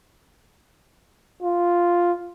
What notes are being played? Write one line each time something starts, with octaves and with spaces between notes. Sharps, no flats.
F4